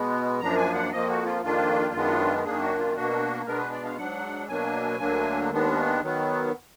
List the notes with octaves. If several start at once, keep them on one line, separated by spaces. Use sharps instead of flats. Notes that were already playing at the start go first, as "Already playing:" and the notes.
Already playing: B2 G#3 B3
F#2 F3 A#3 D4 A#5
G#5
F#5
F2 F3 A#3 D#5
F#4
F4
F2 D#3 A#3 D4 F4
F#2 D#3 G#3 B3 D4
F#2 D#3 A#3 D4 G#4
F#4
F4
B2 A#3 D4 F#4
B2 G#3 B3 D4 A#4
B4
D5
F5
G#2 F#3 D4 F#5
B2 F#3 A#3 D4 G#5
D2 D3 F#3 A#3 D4
D#2 D#3 G#3 B3 D4
D#3 F#3 B3